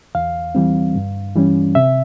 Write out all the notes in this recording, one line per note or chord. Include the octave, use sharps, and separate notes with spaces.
E2 F5
E3 G3 C4
G2
E3 G3 C#4
C3 E5